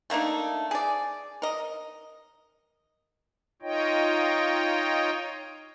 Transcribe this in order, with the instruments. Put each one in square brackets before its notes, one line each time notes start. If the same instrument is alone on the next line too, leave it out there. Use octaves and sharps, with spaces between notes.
[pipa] A3 A#3 D4 D#4
G#4 D5
A#4 D#5
[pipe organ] D#4 F4 C#5 D#5 G5